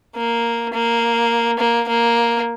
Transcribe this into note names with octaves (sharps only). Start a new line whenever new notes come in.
A#3
A#3
A#3
A#3